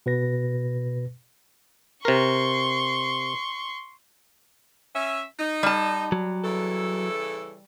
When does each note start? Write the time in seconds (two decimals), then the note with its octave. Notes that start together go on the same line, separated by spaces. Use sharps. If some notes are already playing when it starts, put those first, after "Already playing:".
0.06 B2 B4 A#6
2.05 C3 A#4 C6 C#6
4.95 C#4 E5
5.39 D#4
5.63 G3 A5
6.12 F#3
6.45 C#3 E3 A4